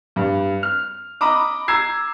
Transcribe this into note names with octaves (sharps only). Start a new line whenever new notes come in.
G2
F6
D#5 A#5 B5 D6
A#5 E6 G#6 C7